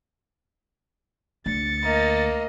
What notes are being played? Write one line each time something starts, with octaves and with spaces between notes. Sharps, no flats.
D2 A6 C#7
A#3 D#5